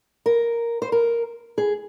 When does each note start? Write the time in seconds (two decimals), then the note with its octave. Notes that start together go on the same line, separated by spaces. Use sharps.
0.26 A#4
0.82 C5
0.92 A#4
1.58 G#4